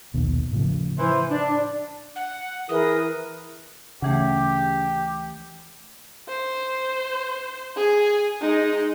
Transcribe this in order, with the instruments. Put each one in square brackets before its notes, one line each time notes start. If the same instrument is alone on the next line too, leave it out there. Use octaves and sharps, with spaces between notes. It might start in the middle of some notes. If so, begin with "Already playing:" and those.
[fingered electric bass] A#1 D#2 B2
A2 C#3 F3
[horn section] E3 C5
D4
[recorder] F#5
[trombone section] E3 E4 [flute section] G#4 A#4 B4 [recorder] D#6
[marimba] D2 E3 A3 [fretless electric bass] C#3 [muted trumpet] G4
[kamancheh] C5
G#4 G#5
G#3 D#4